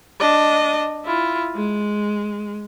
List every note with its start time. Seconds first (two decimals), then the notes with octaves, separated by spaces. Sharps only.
0.20 D4 D#5
1.05 E4 F4
1.55 G#3